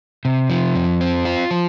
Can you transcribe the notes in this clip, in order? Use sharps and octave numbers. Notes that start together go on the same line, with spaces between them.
C3
F3
F2
C4
F4
F3